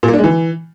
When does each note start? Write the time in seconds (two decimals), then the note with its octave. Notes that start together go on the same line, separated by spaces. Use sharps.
0.03 A#2
0.08 A#3
0.13 D4
0.18 G#3
0.24 E3